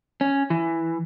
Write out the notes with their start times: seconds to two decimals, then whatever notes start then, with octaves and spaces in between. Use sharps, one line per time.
0.21 C#4
0.50 E3